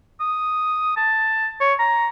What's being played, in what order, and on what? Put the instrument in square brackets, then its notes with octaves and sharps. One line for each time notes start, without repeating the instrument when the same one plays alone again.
[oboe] D#6
A5
C#5
A#5